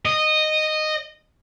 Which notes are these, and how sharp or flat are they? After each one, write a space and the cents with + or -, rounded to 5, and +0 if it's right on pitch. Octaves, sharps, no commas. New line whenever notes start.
D#5 -10